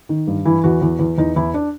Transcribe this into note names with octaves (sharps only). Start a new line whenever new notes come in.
D#3
G2
E3 E4
E2 F#4
E2
E2
E2 D#4
E2 E4
D4